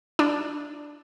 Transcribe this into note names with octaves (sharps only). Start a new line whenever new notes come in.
D4